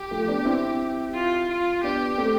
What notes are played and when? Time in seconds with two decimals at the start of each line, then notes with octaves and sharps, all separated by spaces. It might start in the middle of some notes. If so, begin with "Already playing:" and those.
Already playing: G4
0.11 F3 A3
0.28 B3 D4
0.45 C4 E4
1.14 F4
1.49 F4
1.84 B3 D4 G4
2.18 A3 C4